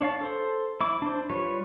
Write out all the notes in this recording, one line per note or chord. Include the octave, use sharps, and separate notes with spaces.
D4 C#5 F5 A5
A4 C5
E4 D6
D4 C5
G3 F4 B4 C#5